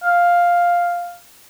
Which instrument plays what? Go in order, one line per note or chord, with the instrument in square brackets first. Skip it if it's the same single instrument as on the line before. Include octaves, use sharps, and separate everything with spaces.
[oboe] F5